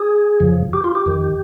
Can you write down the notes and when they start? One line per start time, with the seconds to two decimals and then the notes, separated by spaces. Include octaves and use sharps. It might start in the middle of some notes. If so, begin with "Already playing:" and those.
Already playing: G#4
0.40 F2 C#3 F3
0.73 G4
0.84 F4
0.95 G4
1.06 F2 D#3